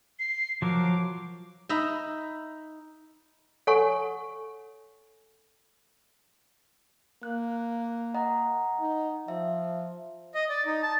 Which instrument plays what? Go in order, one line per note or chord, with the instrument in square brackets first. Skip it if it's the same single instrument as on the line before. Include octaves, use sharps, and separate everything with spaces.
[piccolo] C7
[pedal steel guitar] F3 F#3 A#4 [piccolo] D6
[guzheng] D#4 E5 A#5 B5
[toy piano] A4 C#5 F#5 G#5 C#6
[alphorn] A#3 [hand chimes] F#6
[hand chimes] D#5 F#5 A#5
[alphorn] D#4
[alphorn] F3 [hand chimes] E5
[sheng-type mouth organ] D#5
D5
D#4
A5